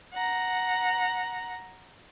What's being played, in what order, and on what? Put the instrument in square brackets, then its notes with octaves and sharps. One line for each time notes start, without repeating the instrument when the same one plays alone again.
[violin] F#5 A#5